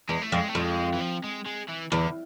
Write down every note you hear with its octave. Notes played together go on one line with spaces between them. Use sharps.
E2 G#3
A3
F2
G#3
A3
F2
G#3
E3
F3
G#3
G#3
E3
E2 D3